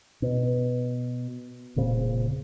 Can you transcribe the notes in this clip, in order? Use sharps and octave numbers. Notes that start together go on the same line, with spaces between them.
B2
E1 A#2 C#3 C4